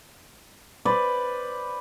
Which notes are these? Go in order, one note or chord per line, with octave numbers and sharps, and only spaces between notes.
B4 C5 D5